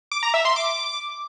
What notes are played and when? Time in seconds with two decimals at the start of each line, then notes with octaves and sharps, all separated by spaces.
0.11 D6
0.23 A#5
0.34 E5
0.45 C6
0.56 D6